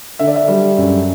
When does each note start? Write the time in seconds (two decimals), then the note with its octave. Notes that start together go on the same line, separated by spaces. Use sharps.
0.19 D3 E5
0.27 D5
0.36 E5
0.48 G3
0.78 F#2